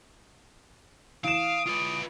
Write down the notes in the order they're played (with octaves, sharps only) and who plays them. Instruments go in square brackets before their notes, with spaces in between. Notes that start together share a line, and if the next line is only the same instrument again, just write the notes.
[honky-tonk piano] E3 E7 [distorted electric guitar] F5 [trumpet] D#6 [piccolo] D7
[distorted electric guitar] F4 B4